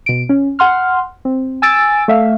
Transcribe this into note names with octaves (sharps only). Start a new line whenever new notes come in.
B2 D7
C#4
F#5 C6 F6
C4
G#5 E6 A6 D7
A3 E5 F5